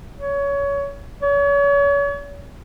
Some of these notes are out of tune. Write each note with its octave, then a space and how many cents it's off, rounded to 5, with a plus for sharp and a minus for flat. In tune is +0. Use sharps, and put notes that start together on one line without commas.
C#5 +20
C#5 +35